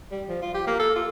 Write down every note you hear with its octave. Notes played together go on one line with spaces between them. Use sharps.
G3
F3
F4
G4
A#3
A4
F4